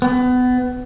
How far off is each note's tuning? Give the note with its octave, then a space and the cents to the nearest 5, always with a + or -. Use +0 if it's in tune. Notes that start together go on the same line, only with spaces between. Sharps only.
B3 +25